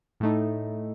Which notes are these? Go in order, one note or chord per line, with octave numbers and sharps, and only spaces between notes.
A2 A3 D#4